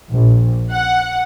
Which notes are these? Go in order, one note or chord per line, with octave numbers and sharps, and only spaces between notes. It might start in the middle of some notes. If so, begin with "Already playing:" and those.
A#1
F#5